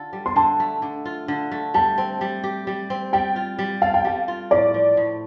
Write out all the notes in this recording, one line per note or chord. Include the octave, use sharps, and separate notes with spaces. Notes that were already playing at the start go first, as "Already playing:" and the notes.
Already playing: D3 F4 A4
G3
C6
D3 A5
A3
D3
F4
D3
A3
G3 A5
C4
G3
G4
G3
C4
G3 G5
F4
G3
A4 F5
G5
G3 F5
F4
A2 D5
F3
A2